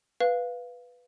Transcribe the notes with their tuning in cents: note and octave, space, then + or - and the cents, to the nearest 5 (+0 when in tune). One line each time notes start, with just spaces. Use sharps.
B4 +0 F5 +0